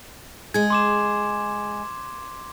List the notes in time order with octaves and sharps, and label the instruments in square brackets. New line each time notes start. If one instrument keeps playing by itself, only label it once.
[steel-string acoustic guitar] G#3 G#4 [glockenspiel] G#6
[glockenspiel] C6 D6 E7